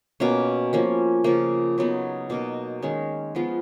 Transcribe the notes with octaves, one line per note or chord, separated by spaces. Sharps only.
B2 A#3 C#4
F3 A#3 C#4
C#3 F3 A#3
C#3 F#3 B3 D#4
B2 A#3 D#4 A#4
D#3 G#3 C#4
F3 G#3 B3 F4